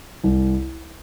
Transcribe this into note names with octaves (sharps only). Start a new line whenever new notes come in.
C2